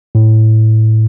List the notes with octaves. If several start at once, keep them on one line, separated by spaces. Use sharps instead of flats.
A2